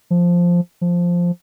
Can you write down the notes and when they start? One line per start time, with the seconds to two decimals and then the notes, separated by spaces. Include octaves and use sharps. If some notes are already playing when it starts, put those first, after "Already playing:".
0.11 F3
0.81 F3